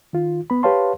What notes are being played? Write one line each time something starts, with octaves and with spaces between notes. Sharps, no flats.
D#3 F4
B3 B5
G4 B4 C#5 F5 A5 C6